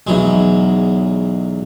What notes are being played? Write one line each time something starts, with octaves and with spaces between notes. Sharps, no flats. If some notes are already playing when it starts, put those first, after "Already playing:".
B1 E2 F#3 G#3